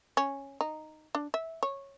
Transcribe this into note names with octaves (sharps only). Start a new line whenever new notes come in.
C#4
D#4
D4
E5
C#5